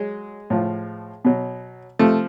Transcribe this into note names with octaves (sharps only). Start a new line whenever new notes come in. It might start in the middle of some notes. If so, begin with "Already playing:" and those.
Already playing: F#3 G#3
A2 F3
B2 F#3
C3 F3 A3